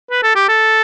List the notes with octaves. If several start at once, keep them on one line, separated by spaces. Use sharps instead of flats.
B4
A4
G4
A4